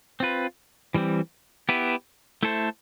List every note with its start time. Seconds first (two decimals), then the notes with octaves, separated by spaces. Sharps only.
0.20 C4 F4 B4
0.94 E3 G3 C4
1.69 B3 E4 G4 B4
2.43 A3 E4 A4 C5